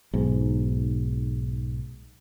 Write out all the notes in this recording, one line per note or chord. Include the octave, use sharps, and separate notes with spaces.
B1 G#2